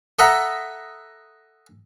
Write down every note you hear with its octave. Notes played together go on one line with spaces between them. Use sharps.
A4 D#5 E5 F#5 A#5 B5